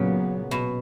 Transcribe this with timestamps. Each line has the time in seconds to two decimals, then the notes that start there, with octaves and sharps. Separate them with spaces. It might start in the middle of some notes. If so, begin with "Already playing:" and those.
Already playing: A#2 C#3 F#3 B3
0.51 B2